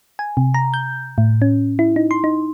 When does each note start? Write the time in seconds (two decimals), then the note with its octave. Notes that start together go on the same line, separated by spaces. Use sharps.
0.19 G#5
0.37 C3
0.54 A#5
0.74 G6
1.18 A2
1.42 C#4
1.79 E4
1.96 D#4
2.11 C6
2.24 D#4